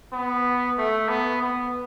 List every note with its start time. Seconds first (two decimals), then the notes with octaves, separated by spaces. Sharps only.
0.13 B3
0.78 A3
1.09 B3
1.41 B3